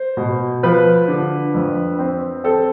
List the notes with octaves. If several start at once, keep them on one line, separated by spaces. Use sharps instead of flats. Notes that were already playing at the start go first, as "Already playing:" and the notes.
Already playing: C5
B2
F3 B4
D3
F2
C4
C4 A4